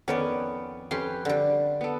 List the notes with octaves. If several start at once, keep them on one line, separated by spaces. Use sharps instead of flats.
F2 D#3 B3 C#4 D5
F2 C#4 G4 B4 C6
D3 G3
B3 A4